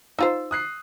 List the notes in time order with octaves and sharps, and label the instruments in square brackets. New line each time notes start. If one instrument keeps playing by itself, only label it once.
[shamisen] D#4 F4 C5 [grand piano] E6
[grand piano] D#6 F#6 C7